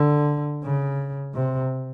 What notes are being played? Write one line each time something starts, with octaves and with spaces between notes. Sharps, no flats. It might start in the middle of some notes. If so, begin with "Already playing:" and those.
Already playing: D3
C#3
C3